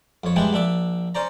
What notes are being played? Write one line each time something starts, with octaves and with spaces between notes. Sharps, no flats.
F2 C#5
E3 G3 G#3 D4 G4 G#4
A#1 D4 E5 D6
C#4 C5 D5 A#5